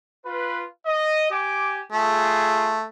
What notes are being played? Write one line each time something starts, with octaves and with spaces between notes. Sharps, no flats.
F4 B4
D#5
G4 G#5 D6
A3 F4 G#4